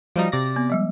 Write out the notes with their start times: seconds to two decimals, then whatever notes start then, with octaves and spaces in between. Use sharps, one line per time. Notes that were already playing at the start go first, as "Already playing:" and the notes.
0.16 F3 G3 D#4 F#4 F5
0.32 C3 D5 A#6
0.56 B3
0.70 F3 G3 G#3